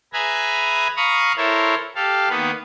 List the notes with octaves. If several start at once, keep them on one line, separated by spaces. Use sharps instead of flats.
G#4 B4 E5 G#5 A#5 B5
F5 A#5 B5 C#6 D#6
E4 A4 A#4 C5 C#5
G4 A4 F5
D#3 A#3 B3 B4